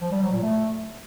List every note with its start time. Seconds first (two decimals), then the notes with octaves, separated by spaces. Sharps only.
0.02 F3
0.12 G3
0.22 F#3
0.32 A#2
0.43 A3